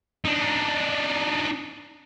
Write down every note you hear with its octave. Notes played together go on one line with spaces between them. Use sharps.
D4 D#4